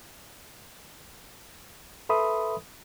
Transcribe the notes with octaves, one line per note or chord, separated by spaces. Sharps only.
A4 B4 E5 B5 C6 D#6